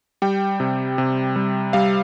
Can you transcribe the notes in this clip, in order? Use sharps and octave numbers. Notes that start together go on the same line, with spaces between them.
G3 G5
C3
C3
G3
G3 F5